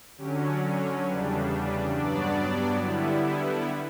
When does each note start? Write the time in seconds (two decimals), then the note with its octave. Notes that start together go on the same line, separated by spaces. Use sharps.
0.17 D3 F#3 C#4 G4
0.47 D5
0.76 C#5
1.04 E2 C#3 G3 D4 B4
1.34 A4
1.62 B4
1.92 G2 F#3 B3 D4 D5
2.79 D3 G3 B3 E4